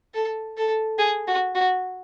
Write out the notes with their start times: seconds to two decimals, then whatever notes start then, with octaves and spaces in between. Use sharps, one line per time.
0.14 A4
0.58 A4
0.99 G#4
1.28 F#4
1.55 F#4